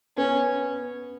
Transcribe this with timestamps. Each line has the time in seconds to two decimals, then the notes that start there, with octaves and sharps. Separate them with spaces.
0.17 B3 C#4